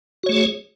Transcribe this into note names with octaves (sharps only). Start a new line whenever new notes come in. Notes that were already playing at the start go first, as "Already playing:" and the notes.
A3 F#4 G#4 C#5